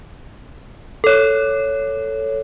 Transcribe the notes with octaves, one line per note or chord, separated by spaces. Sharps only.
A4 C#5